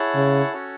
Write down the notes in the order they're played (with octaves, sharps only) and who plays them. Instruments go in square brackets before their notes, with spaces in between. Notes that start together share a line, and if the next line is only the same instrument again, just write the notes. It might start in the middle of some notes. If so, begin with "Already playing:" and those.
Already playing: [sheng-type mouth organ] E4 G#4 C#5 F#5 A5
[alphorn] C#3
[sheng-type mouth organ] C#4 F#4 A4 C#5